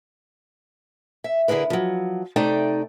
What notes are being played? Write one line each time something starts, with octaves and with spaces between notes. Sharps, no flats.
E5
D3 E4 G#4 A#4 B4
F3 F#3
C3 A3 D#4 D5 G5